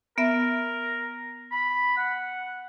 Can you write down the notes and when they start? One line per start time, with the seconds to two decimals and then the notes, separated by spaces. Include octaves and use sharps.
0.18 B3 A#4 E5
1.52 B5
1.97 F#5